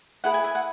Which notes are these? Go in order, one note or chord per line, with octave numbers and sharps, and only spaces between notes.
E4 G#4 B4 F#5
G#5
E5
F#5